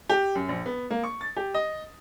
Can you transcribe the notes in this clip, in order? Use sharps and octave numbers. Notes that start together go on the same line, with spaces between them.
G4
F#2
A#1
B3
A#3
C#6
A6
G4
D#5